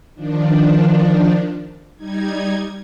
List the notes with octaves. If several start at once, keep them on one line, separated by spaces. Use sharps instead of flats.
D#3 F3 D4
G3 D#4 G#6